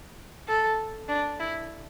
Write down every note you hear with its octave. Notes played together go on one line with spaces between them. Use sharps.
A4
D4
E4